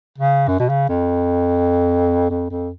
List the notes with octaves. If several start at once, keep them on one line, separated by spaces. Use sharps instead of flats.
C#3
F#2
B2
C#3
F2
F2
F2